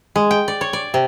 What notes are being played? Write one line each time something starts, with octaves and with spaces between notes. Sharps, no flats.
G#3
G5
D5
C#5
D5
C3